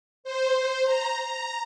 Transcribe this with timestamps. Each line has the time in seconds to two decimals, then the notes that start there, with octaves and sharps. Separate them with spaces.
0.24 C5
0.84 A#5
1.24 A#5